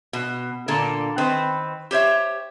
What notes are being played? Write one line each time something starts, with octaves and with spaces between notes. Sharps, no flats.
B2
A#2 D3 A#3 A4
D#3 C4 B4
G4 C5 C#5 E5